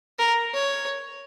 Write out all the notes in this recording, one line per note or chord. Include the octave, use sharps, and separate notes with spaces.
A#4
C#5